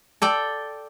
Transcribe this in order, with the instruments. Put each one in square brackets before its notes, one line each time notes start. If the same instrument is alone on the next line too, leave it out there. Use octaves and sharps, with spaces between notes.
[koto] A4 D5 G5